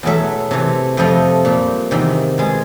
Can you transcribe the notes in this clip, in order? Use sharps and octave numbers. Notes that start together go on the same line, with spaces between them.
E2 B2 F#3 A3 E5
C3 E3 A3
F2 C3 F3 A3 D#5
A#2 G3
E2 C3 D#3
B2 G#3